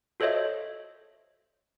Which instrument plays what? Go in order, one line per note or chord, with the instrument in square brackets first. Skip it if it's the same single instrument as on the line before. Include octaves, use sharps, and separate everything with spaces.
[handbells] F#4 A4 C5 C#5 D#5 E5